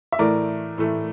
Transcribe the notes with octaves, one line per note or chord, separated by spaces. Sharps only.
E5
A2 E3 A3 A#4 D5
A2 E3 A3